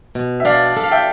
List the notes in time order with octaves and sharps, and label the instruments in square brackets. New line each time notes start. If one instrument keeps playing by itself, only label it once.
[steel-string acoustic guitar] B2
[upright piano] E5
[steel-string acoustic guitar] D4 [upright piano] D5 F5
[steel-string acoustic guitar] A4
[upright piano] F5
E5 G5